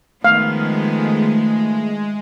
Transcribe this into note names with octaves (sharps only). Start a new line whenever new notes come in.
D#3 F3 G#3 A3 B3 F5